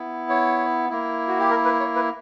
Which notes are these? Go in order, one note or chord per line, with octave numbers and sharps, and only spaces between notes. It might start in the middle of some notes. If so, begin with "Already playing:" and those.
Already playing: B3 E4
C#5
A#3 E4
F#4
G4
A#4
B4
C#5
B4